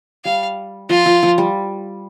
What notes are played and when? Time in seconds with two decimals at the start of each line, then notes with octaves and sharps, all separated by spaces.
0.25 G3 F5
0.89 F3 F4
1.06 F3
1.23 F3
1.38 G3